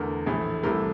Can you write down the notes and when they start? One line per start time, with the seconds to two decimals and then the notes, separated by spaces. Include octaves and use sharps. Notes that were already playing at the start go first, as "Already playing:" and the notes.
Already playing: E2 D3 A3 A#4
0.26 A#1 A2 E3 A3
0.63 C2 C3 E3 A3 A#4